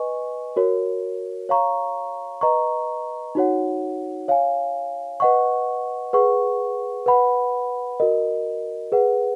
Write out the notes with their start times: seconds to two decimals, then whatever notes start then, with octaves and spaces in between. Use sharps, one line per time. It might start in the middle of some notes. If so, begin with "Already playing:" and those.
Already playing: B4 D#5 G#5 C#6
0.56 F#4 A#4 C#5
1.49 C#5 F5 A#5 C#6
2.41 B4 D#5 A#5 C#6
3.35 D#4 F#4 C#5 F#5
4.28 C#5 F5 G#5
5.20 B4 D#5 F#5 C#6
6.13 G#4 B4 F#5 C#6
7.06 B4 F#5 B5
8.00 F#4 A#4 D#5
8.92 G#4 B4 F#5